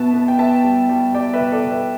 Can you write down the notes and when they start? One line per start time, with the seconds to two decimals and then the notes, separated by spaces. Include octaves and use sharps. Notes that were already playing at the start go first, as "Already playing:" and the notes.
Already playing: B2 B3 E5 A5
0.14 B3
0.28 G5
0.39 B3 E5 A5
0.64 G3
0.89 G3
1.14 G3 D5 G5
1.34 B4 E5
1.40 B2
1.52 A4 D5
1.65 B2
1.71 B4 E5